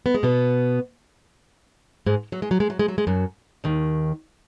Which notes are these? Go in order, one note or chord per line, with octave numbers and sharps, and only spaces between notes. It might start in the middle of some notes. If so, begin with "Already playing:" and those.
B3
G#3
B2 B3
G#2 G#3
F#3
G#3
F#3
G#3
F#3
G#3
F#3
G#3
F#2 F#3
D#2 D#3